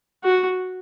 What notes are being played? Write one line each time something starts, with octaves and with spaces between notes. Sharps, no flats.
F#4